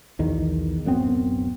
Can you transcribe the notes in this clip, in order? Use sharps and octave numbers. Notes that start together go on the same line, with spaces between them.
B1 E2 D#3
D1 F#2 B3 C4